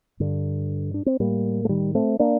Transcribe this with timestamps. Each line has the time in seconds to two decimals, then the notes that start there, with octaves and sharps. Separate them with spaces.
0.20 G2 D3
0.94 D4
1.06 C4
1.20 A2 G3 A#3
1.65 A3
1.69 D#3 G3
1.95 A3 C4
2.19 A#3 D4